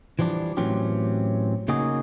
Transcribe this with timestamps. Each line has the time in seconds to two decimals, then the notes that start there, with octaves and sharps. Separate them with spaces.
0.19 E3 F3 G3 D4
0.57 A2 E3 F#3 C4 C#4 G4
1.68 C#3 A#3 D#4 F#4 G#4